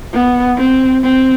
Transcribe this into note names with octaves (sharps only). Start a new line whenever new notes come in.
B3
C4
C4